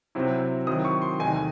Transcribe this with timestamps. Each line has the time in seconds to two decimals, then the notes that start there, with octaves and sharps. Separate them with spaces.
0.15 C3 F#3 C4 E4
0.67 D#3 F#3 C4 E4 D#6
0.85 C#6
1.02 C6
1.19 E2 C3 D#3 A3 D#4 G#5